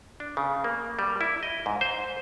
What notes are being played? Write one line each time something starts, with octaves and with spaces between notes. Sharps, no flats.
D4
C#3
A#3
G3
E4
D#5
G#2
C5